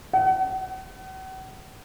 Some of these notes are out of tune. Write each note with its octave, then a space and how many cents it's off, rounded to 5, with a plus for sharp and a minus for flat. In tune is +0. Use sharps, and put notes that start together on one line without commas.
F#5 +40